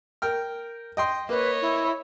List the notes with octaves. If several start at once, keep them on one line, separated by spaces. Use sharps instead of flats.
A#4 G5 F6
D#5 G5 C6
A#3 B4 C#5 D#5
E4